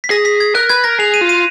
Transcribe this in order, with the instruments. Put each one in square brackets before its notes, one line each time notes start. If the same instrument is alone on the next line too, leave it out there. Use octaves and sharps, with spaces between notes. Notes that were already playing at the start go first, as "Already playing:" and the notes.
[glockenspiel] B6
[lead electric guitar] G#4 [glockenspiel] A#6
[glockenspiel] B6
G#6
[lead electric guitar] A#4 [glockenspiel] F#6
[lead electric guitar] B4 [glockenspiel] G#6
[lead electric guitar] A#4 [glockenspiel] A#6
[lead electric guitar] G#4 [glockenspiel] F7
[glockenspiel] D#7
[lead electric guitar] F4
[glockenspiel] D#7